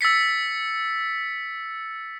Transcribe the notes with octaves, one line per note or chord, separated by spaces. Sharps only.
E6 A6 B6 C#7